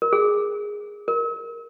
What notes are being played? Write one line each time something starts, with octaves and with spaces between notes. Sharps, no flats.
A#4
G#4
A#4